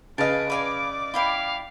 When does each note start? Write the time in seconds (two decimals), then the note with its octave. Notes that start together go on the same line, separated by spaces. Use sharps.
0.18 C#3 B4 D#5 F5 G#5 A5 D7
0.50 B4 D5 F5 G#5 D6
1.14 E4 F5 G5 B5